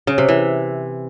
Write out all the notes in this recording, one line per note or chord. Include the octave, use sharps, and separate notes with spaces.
C#3
C3
E3